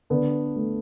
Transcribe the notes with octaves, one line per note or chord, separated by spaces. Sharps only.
D3 B3 D4
A3